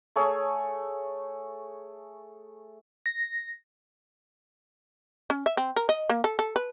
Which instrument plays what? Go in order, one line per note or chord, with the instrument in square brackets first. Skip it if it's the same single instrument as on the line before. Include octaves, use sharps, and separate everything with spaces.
[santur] A3 G#4 C#5
[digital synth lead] A#6
[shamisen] C#4
E5
C4
A#4
D#5
A#3
A4
A4
B4